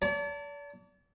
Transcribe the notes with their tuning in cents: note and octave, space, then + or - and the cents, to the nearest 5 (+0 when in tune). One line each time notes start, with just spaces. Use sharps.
D5 -40 A5 +30